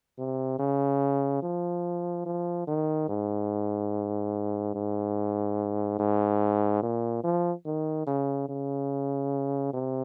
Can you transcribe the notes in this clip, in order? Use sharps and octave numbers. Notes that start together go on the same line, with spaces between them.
C3
C#3
F3
F3
D#3
G#2
G#2
G#2
A#2
F3
D#3
C#3
C#3
C3